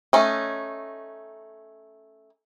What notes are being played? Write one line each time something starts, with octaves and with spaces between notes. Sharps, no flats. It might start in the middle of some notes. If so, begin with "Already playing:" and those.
A3 C#4 D#4